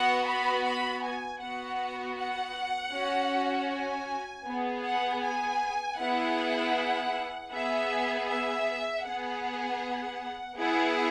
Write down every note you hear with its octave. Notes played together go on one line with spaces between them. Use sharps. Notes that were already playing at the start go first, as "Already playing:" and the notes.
Already playing: B3 F#4 F#5
B5
B5
G#5
B3 F#4 F#5
F#5
C#4 F#4
G#5
B3 G#4
F#5
G#5
B3 E4 G#4 F#5
B3 G#4 E5
E5
B3 G#4 F#5
B3 E4 G#4 F#5